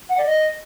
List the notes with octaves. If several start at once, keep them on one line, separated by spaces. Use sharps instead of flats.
F#5
D5
D#5